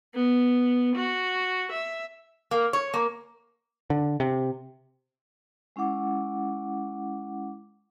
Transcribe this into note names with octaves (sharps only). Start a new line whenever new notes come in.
B3
F#4
E5
A#3
C#5
A#3
D3
C3
G#3 C#4 E4 F#5 D6